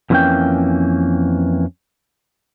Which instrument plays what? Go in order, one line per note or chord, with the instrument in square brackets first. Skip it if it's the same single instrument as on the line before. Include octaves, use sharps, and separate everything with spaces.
[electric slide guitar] F2 A2 E3 A#3 C#4 G5